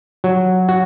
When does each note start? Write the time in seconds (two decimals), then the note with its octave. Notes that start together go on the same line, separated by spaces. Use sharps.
0.24 F#3
0.69 F#4